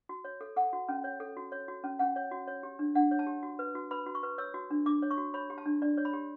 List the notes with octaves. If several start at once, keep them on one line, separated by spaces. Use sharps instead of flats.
F#4
C#5
A4
A4 F#5
F#4
C#4
C#5
A4
F#4
C#5
F#4
C#4
C#4 F#5
C#5
F#4
C#5
G4
D4
D4 F#5
C#5
A5
G4
F#4
B4
F#4
B4 B5
F#4
C#6
B4
C#5 E6
F#4
D4
D4 D6
C#5
C#6
F#4
C#5 B5
G4
A5
D4
D4 D5
C#5
B5
G4